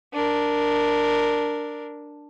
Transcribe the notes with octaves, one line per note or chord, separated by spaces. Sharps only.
D4 A#4